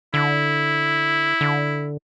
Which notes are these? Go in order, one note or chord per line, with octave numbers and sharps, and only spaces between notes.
D3 E4
D3